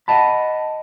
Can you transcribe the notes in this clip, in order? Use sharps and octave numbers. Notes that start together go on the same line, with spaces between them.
D#5 F#5 A5 B5